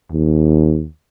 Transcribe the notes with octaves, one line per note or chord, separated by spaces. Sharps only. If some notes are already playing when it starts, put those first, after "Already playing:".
D#2